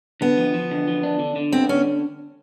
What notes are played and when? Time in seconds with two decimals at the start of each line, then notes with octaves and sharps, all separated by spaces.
0.21 D3 B3
0.38 F3
0.54 F3
0.71 D3
0.87 F3
1.03 D4
1.19 D3
1.36 D3
1.52 B3 C4
1.69 D3 C#4